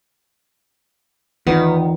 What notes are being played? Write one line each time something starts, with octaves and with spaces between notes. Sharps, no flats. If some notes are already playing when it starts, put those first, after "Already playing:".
E2 D#3 B3 D#4 F4